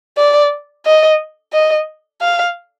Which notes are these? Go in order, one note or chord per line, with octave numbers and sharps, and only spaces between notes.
D5
D#5
D#5
F5